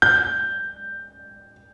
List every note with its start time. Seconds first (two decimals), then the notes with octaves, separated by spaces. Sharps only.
0.02 G6